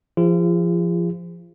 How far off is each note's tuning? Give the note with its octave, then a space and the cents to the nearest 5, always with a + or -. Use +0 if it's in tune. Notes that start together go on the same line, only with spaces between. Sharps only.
F3 -20 F4 -40 G#4 -40